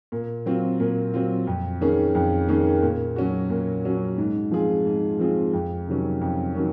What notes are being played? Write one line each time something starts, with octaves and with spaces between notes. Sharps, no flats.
A#2
F#3 C4 F4
A#2
F#3 C4 F4
F2
D#3 A#3 C#4 G#4
F2
D#3 A#3 C#4 G#4
A#2
F#3 C#4 F#4
A#2
F#3 C#4 F#4
G#2
F3 C4 F4 G#4
G#2
F3 C4 F4 G#4
F2
C3 D#3 F#3 C#4
F2
D#3 F#3 C#4